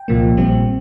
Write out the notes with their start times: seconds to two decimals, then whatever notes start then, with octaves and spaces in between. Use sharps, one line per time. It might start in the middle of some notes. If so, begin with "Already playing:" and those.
Already playing: G5
0.08 C2 A#2 F3 A#3
0.37 A#1 A#2 G3 C4